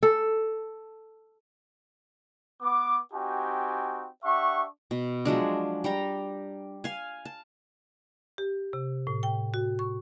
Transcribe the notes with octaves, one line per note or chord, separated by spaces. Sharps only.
A4
B3 D6
C4 D#4 F#4 G4 G5 G#5
D4 G4 E5 F#5 C#6
B2
F3 F#3 G#3 D4
G3 G5 A#5
F5 G#5
A5
G4
C3
A2
G5
F#4
C#6